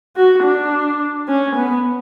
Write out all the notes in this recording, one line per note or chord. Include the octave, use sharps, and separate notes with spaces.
F#4
D4
C#4
B3